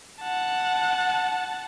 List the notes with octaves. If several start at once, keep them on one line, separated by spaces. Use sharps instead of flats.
F#5 A5